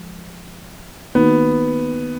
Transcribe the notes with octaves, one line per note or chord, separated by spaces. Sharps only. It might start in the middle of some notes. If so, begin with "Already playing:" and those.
Already playing: F3 G#3
D#3 A#3 B3 D#4 F#4